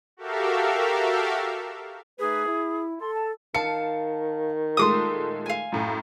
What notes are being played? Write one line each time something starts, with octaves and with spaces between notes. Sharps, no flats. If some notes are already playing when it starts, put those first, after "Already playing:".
F#4 G4 A4 A#4 E5 F5
A3 D#4 G#4 B4
E4
A4 C6
A5
D#3 F5 A5 C#7
A#2 G#3 A3 C6 D6 D#6
F5 G#5
F#2 A2